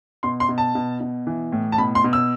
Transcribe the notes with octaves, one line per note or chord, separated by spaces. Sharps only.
B2 C6
C6
B2
A5
B2
B2
E3
A2
A5
B2 B5
C6
B2
E6